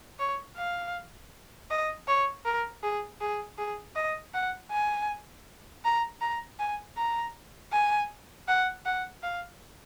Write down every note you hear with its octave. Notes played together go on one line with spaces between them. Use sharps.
C#5
F5
D#5
C#5
A#4
G#4
G#4
G#4
D#5
F#5
G#5
A#5
A#5
G#5
A#5
G#5
F#5
F#5
F5